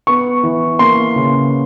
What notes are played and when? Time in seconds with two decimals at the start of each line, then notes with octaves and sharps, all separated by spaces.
0.07 B3 C#6
0.43 E3
0.79 A#3 C6
1.16 C#3